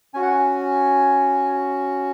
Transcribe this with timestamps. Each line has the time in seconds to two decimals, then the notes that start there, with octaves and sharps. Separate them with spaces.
0.14 C#4 F#4 G#5
0.22 F#5
0.30 G#5